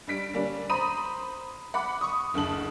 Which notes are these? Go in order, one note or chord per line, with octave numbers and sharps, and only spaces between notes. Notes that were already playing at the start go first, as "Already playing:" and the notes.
G2 G3 B6 D7
D3 G3 A#3 C#4 D4
C5 A#5 B5 D#6 D#7
F#5 B5 D6
C#6 D#6
F#1 D2 C#3 A5 F#7